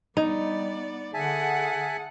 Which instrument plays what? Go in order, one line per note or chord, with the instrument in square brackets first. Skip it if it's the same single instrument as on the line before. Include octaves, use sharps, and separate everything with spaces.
[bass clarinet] G3 [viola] B3 D5 [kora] D#4
[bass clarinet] D3 [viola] G#4 F#5 [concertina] E5 G#5 A5